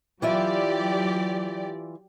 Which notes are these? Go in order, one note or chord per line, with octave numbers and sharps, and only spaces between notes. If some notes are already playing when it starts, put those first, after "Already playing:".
E3 F#3 F4 G4 D5 E5